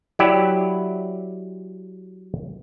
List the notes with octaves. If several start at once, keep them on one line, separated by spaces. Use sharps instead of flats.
F#3 E4 G4 D5 E5